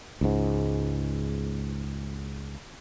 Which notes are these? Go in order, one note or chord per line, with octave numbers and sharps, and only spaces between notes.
C#2 G#2